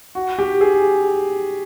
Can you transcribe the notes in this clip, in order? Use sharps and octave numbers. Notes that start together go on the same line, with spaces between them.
F#4
G4
G#4